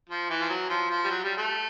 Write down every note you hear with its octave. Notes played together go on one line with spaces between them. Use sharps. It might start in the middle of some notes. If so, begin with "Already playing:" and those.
F3
E3
F3
F#3
F3
F3
G3
F#3
G3
A3